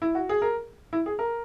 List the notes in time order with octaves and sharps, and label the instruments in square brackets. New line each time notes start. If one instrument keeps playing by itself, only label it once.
[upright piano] E4
F#4
G#4
A#4
E4
G#4
A#4